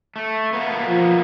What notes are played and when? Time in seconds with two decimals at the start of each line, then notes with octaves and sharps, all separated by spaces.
0.16 A3
0.53 B2 A#3 B3
0.87 F3